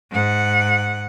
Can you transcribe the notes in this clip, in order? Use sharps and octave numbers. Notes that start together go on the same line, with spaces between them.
G#2 F#5